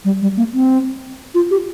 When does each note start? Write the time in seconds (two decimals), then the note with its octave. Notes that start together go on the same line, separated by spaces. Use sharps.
0.05 G3
0.22 G3
0.37 A#3
0.54 C4
1.35 F4
1.51 G4